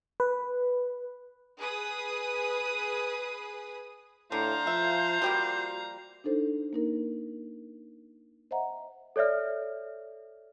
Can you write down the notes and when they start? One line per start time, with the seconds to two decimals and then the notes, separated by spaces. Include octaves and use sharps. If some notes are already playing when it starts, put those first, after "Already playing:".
0.20 B4
1.58 G#4 B4 D#6
4.32 A2 D3 C5 F5 A#5
4.67 F3 E5
5.22 F3 G3 A#3 F#4
6.24 D4 D#4 A4 C5
6.73 A#3 D#4 A#4
8.51 C5 D#5 E5 F#5 A#5
9.16 A4 C#5 D5 E5 F6